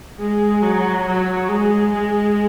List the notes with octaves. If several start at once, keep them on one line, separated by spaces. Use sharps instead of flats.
G#3
F#3
F#3
G#3
G#3